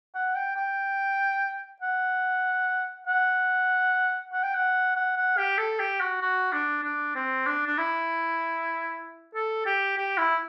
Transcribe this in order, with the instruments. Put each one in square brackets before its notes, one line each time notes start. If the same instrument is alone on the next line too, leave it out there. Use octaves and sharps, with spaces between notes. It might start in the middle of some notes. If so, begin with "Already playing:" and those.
[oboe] F#5
G5
G5
F#5
F#5
F#5
G5
F#5
F#5
F#5
G4
A4
G4
F#4
F#4
D4
D4
C4
D4
D4
E4
A4
G4
G4
E4